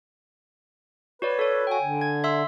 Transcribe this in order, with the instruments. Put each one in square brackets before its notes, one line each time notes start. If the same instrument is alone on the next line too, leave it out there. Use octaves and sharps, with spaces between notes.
[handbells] F#4 C#5 D5 [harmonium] B4
[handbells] A4 C#5
[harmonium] F#4 [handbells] G5 G#5
[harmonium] D3
[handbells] G#6
E5 C6 E6